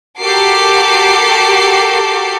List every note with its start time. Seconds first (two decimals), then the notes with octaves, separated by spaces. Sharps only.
0.20 F#4 G4 A4 A#4 D6 C7